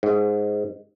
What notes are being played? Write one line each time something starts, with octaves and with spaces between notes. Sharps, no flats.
G#2